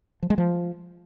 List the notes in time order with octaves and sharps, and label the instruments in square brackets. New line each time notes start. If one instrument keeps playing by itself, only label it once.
[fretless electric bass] F3
G#3
F3